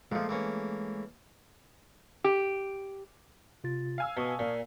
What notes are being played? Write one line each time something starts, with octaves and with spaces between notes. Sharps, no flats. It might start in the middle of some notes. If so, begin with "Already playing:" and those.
A#2 F3 G#3 A3
E3 A#3 C#4
G4
C3 F4 A6
F5 G#5 E6
B2 A5 C#6 D#6
A#2